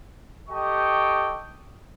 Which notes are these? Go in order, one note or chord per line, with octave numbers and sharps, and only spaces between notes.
G4 A4 D#5 G5 C#6